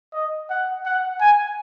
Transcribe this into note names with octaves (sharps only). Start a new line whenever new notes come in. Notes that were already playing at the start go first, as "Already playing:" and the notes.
D#5
F#5
F#5
G#5